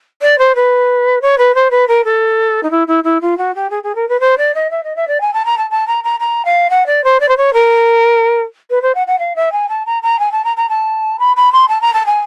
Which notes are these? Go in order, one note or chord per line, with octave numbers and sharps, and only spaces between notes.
D5
C5
B4
C#5
B4
C5
B4
A#4
A4
D#4
E4
E4
E4
F4
F#4
G4
G#4
G#4
A#4
B4
C5
D5
D#5
E5
D#5
E5
D5
G#5
A5
A#5
A5
A5
A#5
A#5
A#5
F5
F#5
D5
C5
D5
C5
C#5
A#4
B4
C5
F#5
F#5
F5
E5
G#5
A5
A#5
A#5
G#5
A5
A#5
A#5
A5
B5
B5
C6
A5
A#5
A5
G#5